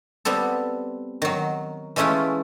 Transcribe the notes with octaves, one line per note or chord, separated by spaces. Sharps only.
G3 B3 C4 A4
D#3 F#3
E3 G#3 A3 C#4 E4 F4